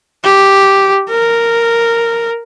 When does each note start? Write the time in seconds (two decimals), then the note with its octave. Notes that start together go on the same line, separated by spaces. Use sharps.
0.24 G4
1.10 A#4